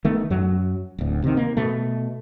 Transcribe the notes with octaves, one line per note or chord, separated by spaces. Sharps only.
D#3 A3 B3
F#2 F#3
D1 D2
C3 D#3
A#3
B2 A3